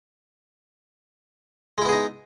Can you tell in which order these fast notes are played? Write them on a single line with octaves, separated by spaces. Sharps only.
G#3 E4 B3 G#4 D#4